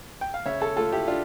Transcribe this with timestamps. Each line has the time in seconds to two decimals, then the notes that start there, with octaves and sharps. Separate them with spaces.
0.21 G5
0.34 F5
0.46 C#3 C#5 E5
0.61 A4 C#5
0.77 A3 F4 A4
0.92 E4 G4
1.08 D4 F4